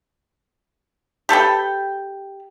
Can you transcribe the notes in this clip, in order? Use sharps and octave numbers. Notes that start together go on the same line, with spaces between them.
G4 A4 B4 G5